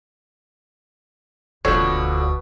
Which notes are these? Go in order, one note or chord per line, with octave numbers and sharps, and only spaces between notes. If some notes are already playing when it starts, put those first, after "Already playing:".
E1 D2 B2 D3 F3 C#5